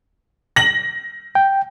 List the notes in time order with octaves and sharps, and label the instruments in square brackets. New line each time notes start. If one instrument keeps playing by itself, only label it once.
[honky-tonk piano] A#6 F#7
[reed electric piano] G5